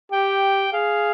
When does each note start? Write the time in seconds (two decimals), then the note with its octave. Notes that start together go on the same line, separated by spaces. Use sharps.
0.12 G4 G5
0.73 G#4 F5